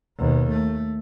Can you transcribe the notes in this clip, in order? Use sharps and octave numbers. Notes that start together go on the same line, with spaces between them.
D#2 B2
A3